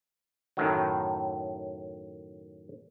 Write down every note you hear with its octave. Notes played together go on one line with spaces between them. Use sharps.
F#2 A2 D#3 F#3